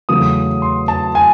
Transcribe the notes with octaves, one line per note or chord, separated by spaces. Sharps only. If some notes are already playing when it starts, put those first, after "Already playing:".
E2 C#3 F#3 A3 D#6
C6
A5
G#5